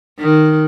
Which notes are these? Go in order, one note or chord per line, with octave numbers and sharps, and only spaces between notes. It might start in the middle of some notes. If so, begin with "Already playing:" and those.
D#3